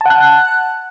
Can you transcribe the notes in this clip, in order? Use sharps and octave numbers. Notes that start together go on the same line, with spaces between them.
F#5 A5 F#6